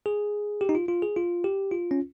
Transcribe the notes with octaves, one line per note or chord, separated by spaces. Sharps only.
G#4
G4
D#4
F4
F4
G#4
F4
G4
F4
C#4